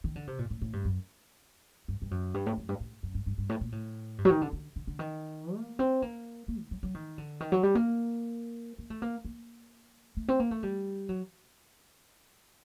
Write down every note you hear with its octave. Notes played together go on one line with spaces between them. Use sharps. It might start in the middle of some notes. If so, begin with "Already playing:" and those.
D#3
D3
C3
A#2
A2
A2
G2
F#2
G2
G2
F#2
G2
A2
F#2
G2
A2
F#2
G2
G2
G2
A2
A#2
A2
G2
F#3
D#3
D3
D3
D3
D3
D#3
A#3
C4
A#3
A#3
D#3
F#3
F#3
D#3
D3
D#3
F#3
G3
A#3
A#3
A3
A#3
A#3
A3
C4
A#3
A3
G3
F#3